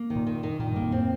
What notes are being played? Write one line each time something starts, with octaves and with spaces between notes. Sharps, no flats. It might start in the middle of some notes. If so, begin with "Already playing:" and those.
Already playing: A#3
D#3
A#2
D#3
D#3
A#2 D#3
G2
A#3
F2
A2 C4